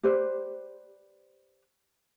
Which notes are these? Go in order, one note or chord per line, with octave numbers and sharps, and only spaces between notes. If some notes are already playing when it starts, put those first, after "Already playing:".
G4 B4 C5 D5